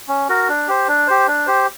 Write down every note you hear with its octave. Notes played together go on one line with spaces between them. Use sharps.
C#4
F#4 A#4
D4
G4 C5
D4
G4 C5
D4
G4 C5